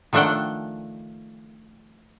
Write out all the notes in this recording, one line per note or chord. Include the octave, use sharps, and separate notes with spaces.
D#3 F3 A3 D4 F#5 G5